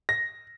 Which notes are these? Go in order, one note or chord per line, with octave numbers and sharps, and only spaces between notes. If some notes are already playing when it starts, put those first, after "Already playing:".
A#6